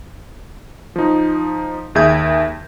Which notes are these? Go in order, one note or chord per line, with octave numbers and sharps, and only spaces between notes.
F3 D#4
D#2 G#4 E5 G6 G#6